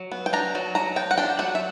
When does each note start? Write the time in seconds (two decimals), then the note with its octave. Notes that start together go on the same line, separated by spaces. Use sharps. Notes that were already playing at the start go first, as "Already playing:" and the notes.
Already playing: F#3
0.12 B3
0.26 G5
0.33 D4 A#5
0.55 F#3
0.75 F#3 A#5
0.96 B3 G5
1.11 F#5
1.18 D4 G5
1.39 F#3 F#5
1.55 E5